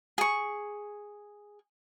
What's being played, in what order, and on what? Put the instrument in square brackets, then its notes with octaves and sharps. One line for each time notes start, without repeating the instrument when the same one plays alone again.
[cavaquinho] G#4 C#6